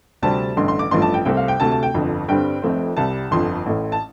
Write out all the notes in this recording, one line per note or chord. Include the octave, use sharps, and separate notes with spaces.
D2 C3 G3 C4 A5
A1 G2 D3 A3 C6
C6
D6
A1 G2 F3 A3 C6
A5
G5
C2 C3 A3 C4 G5
F5
G5
D2 C3 A3 A5
A5
G5
G1 F2 D3
G2 D3 G3 C4 G5
F1 F2 F3 A3 C4
C2 C3 G3 A5
G1 F2 D3 C6
A1 A2 A3
A5